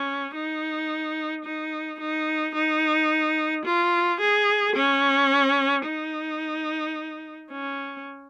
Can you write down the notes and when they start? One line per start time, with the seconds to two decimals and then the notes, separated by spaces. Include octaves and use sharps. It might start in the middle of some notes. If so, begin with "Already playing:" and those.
Already playing: C#4
0.35 D#4
1.45 D#4
2.00 D#4
2.55 D#4
3.65 F4
4.20 G#4
4.76 C#4
5.86 D#4
7.52 C#4